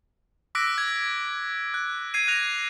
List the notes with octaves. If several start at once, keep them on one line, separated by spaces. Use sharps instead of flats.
D6 E6 F#6 A#6 B6 D7
G#6
F#6
G#6 C7 D#7
F#6 A#6 F7